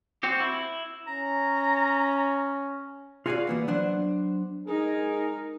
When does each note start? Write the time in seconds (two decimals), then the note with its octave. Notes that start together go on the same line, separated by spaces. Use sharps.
0.23 C4 F#4 G4
0.40 E4
1.07 C#4 A#5
3.26 F4 F#4 G#4 A4 D5 F5
3.47 E3 A#3 B3
3.68 F#3 B3 D4 C5 F#5
4.68 G#3 D#4 G#4 A#4